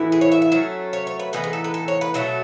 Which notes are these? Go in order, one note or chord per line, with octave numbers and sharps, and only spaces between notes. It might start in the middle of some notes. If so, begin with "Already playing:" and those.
Already playing: A2 E3 B3 E4
G#4
C#5
E5
E5
F#3 A3 C#4
C#5
C#5
B4
A2 E3 B3 D#4 B4
G#4
A4
B4
A4
C#5
B4
B2 F#3 A3 A4